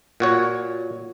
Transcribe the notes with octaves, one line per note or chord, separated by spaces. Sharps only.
A#2 F#4 C#5